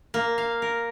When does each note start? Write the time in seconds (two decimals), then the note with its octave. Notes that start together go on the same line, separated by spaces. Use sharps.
0.14 A#3
0.38 F5
0.62 A#4